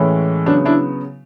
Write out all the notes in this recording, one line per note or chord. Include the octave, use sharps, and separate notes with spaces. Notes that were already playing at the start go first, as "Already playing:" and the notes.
Already playing: A2 E3 G#3 C#4
C#3 F#3 B3 D4
D4 E4